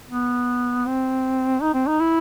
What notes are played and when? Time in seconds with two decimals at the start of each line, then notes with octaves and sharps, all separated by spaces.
0.10 B3
0.86 C4
1.62 D#4
1.74 C4
1.87 D#4
2.00 E4